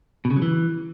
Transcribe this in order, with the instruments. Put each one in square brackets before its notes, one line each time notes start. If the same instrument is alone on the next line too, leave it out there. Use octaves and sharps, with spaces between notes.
[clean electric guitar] B2
C#3
F#3
E3